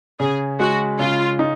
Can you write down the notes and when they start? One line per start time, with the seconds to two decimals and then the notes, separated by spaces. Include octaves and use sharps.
0.20 C#3 G#4
0.59 G#3 F#4
0.99 C#3 F4
1.39 D#4